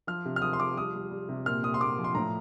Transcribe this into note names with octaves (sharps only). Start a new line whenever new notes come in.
F3 F6
C3
F6
F3 D#6
C6
F3 D6
G3 D#6
G3
G3
C3
A#2 F6
A#2 D#6
C6
A#2 D6
F3
C6
A2 A#5